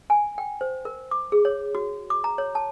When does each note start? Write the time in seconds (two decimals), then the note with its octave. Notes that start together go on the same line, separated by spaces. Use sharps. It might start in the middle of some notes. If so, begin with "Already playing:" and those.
0.10 G#5
0.38 G5
0.61 C5
0.85 A#4
1.11 D6
1.32 G#4
1.45 C#5
1.75 F#4
2.10 D6
2.24 A#5
2.38 C#5
2.55 A5